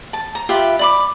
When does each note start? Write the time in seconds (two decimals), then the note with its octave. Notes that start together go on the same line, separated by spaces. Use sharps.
0.13 A5
0.35 A#5
0.49 F4 G4 B4 E5
0.79 D5 B5 D6